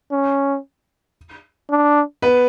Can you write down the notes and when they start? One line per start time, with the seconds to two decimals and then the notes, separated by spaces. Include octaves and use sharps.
0.11 C#4
1.70 D4
2.22 B3 B4